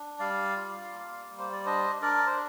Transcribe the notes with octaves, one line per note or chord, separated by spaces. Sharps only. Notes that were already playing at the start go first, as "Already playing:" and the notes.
Already playing: D4
G3 D5 F5
F4
A#3
G3
C5
D5
D4 C5 D#5
D4 A#4 D5
C5